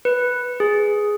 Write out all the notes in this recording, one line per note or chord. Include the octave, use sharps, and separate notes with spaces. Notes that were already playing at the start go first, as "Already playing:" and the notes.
B4
G#4